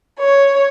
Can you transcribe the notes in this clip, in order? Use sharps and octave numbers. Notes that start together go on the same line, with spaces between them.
C#5